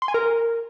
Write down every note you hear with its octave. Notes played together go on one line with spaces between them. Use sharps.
C6
G#5
A#4